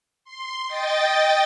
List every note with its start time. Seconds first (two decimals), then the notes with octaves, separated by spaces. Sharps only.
0.25 C6
0.68 D#5 G5 A6